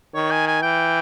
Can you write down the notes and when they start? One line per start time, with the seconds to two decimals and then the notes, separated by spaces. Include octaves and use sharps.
0.14 D#3 C#5
0.31 G#5
0.47 G#5
0.62 E3 G5